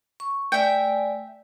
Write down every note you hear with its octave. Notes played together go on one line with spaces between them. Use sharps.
C#6
A3 D5 E5 G5 G#5